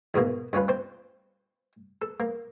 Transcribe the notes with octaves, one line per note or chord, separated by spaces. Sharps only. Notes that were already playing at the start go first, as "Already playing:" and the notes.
E2 G#2 B2 A#3
G2 C#4 F4 B4
C4 C5
A4
A#3